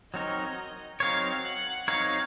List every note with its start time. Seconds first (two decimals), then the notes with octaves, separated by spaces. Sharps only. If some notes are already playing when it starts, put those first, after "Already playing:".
0.14 F#3 C4 D#4 A#4 C#5 D#5
1.00 F#3 C4 D#4 A#4 C#5 F5
1.44 F#5
1.87 F#3 C4 D#4 A#4 C#5 F5